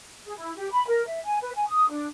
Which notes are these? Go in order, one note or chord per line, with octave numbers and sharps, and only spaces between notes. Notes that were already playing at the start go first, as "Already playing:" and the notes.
G#4
E4
G4
B5
A#4
E5
G#5
B4
G#5
D#6
D4